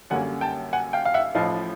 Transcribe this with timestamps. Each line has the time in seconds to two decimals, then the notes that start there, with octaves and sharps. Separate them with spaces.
0.10 F#2 D3 G3 A#3 C#4 F#5 G#5
0.41 G5 A5
0.73 F#5 G#5
0.93 F5 G5
1.05 F5
1.14 E5 F#5
1.34 A1 A2 F3 D#5 F5